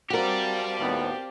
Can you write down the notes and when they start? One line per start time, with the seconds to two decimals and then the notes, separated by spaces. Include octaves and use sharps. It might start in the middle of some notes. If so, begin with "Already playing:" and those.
0.10 C4 F#4 G4 A#4 D5 F5 A5
0.78 D#2 A2 B3